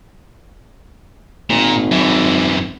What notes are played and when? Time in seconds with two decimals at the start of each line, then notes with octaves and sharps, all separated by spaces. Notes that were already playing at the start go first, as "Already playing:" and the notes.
1.50 G#1 A#2
1.91 F#2 E3